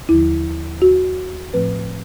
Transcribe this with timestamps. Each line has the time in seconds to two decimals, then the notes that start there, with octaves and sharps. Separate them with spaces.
0.09 D#2 D3 F3 E4
0.82 F#4
1.53 A2 F3 A3 C4 B4